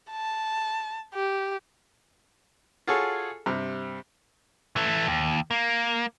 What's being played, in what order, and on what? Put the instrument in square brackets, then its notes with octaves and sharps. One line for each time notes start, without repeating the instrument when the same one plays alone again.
[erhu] A5
G4
[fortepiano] F4 F#4 G#4 A4 C#5
G2 C3
[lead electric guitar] E3 A3
D#2
A#3